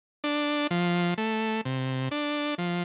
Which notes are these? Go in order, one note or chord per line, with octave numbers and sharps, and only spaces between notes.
D4
F3
A3
C3
D4
F3